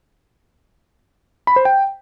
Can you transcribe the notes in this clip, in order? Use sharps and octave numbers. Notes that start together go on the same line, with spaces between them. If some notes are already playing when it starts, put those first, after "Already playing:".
B5
C5
G5